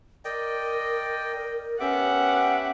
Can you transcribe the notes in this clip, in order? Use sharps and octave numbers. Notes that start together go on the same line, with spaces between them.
A#4 D5 D#5 G5
B3 C#4 G4 E5 F#5 D6